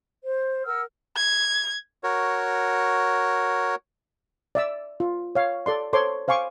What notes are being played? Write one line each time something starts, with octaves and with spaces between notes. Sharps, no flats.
C5
A#4 F#5 E6 F6
G#6
F#4 A#4 C#5
D5 E5 E6
F4
C#5 F5
A4 D5 C6
A4 C5 C#5 C6 D6
C5 F5 G#5 C#6 D6